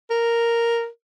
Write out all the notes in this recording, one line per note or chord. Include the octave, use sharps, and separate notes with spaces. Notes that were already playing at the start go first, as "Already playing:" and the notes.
A#4